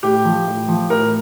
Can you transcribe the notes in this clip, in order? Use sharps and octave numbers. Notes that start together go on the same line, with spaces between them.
A2 G4
F3
A2
F3
A2 A#4